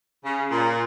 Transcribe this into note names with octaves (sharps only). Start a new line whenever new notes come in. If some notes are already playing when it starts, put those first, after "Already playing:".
C#3
A#2